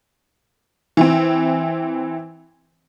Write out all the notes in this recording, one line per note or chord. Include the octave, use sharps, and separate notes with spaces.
E3 C4